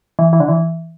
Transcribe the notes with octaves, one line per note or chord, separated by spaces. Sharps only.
E3
E3
D3
E3